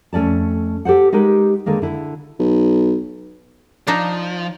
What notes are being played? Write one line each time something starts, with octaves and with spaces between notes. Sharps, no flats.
F2 A3 C#4 D5 A5
G4 A4 C5 F#5
G#3 D#4 G4 A#4 B4
D3 D#3 G#3 A#3
D3 E4
B1
F3 D4 D#4